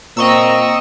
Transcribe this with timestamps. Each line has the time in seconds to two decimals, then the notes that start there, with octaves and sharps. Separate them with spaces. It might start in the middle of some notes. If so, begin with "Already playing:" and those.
0.17 A#2 C4 D#5 A#5 C#6 E6